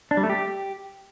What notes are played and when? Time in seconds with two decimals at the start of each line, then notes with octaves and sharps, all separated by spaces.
0.11 D4
0.17 G3
0.23 A3
0.30 G4